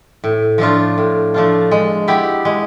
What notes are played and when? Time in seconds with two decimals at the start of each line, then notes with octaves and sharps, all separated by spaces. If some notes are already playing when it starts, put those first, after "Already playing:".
0.24 A2
0.58 F3 A3 D4 F4
0.98 A2
1.34 F3 A3 D4 F4
1.71 G#3
2.08 B3 E4 G4
2.45 G#3